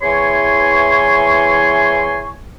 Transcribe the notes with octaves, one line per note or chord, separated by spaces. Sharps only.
E2 E3 C#5 G#5 C6 C#6